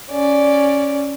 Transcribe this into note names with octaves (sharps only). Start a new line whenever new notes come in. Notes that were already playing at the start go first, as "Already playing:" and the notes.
C#4 D5